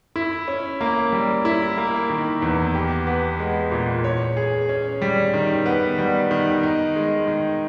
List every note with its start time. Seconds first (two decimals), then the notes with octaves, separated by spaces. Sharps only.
0.16 E4
0.48 C#4
0.81 A#3
1.12 G3
1.45 E4
1.78 A#3
2.10 D#3
2.42 E2
2.75 G4
3.07 B3
3.39 G#3
3.72 A#2
4.04 C#5
4.37 G#4
4.69 C#4
5.01 G3
5.34 D#3
5.66 B3
5.98 G3
6.31 D#3
6.63 D#4
6.95 G#3
7.27 D#3